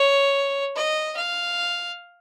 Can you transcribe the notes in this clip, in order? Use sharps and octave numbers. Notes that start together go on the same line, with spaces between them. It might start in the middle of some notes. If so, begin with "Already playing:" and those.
Already playing: C#5
D#5
F5